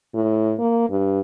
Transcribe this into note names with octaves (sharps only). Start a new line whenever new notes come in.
A2
A#3
G2